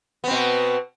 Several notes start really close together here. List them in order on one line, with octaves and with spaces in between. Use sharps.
B3 C4 B2